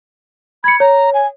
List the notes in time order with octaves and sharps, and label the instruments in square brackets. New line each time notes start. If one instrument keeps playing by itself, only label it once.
[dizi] B5 [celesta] G#6 C#7
[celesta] C#5 [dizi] A#5
[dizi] G#5